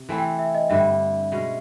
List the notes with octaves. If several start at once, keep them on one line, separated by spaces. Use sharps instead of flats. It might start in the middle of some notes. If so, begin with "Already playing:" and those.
Already playing: C3
E3 A3 C4 E4 G#5
G5
E5
D#5
G2 D3 G3 E5
B2 G#3 C#4